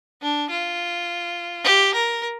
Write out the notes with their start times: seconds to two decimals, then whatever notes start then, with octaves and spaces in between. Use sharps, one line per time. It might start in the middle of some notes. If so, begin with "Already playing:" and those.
0.22 D4
0.50 F4
1.64 G4
1.94 A#4